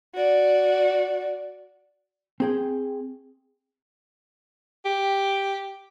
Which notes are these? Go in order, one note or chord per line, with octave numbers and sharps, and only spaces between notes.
F#4 D5
C4 G#4 G5
G4